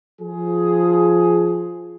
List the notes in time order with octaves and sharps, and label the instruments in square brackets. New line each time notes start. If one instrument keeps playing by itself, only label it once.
[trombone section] F3 G#4